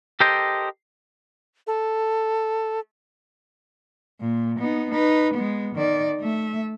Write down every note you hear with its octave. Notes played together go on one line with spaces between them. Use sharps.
G4 A4 A#4 C5 D#5 G5
A4
A#2
B3 D#4
D#4 B4
G#3 B3
D#3 D5
A3 E5